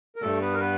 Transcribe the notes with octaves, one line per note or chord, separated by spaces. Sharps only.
A#4
G2 A3 A4
B3 B4
A#4
B3 B4